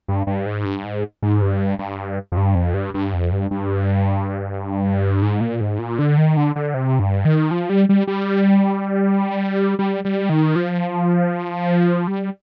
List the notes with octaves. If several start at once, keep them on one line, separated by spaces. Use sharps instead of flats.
G2
G2
G#2
G2
G#2
G#2
G2
G2
F2
G2
F2
G2
G2
F2
G2
G2
G#2
A#2
G#2
A#2
D3
D#3
D3
D3
C3
G2
D#3
F3
G3
G3
G3
G3
G3
D#3
F3
G3